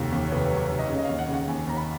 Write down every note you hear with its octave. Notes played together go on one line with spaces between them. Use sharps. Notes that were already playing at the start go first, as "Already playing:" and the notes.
Already playing: F1 D#2 F#4
D#2
C#5
F1 B4
F#3
C#5
F1
D#5
C#3 C#5
D#5
D#2 F5
F#5
C#3
F#5
D#2 G#5
D#2 A#5
B5